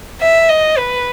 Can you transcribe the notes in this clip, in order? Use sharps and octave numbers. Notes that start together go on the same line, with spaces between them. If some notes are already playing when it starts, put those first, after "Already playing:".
E5
D#5
B4